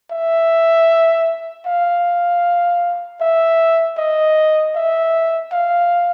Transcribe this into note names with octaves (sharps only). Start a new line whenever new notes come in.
E5
F5
E5
D#5
E5
F5